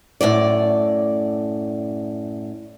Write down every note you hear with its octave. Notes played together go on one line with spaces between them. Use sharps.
F#2 A2 F3 D5